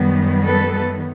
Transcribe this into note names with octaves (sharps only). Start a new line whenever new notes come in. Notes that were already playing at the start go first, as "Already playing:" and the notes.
Already playing: F#2 D#3 G3 B3
A4 B4